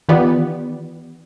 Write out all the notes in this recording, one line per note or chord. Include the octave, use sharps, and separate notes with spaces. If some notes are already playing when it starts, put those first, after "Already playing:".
D#3 E3 B3 F4 G4 D5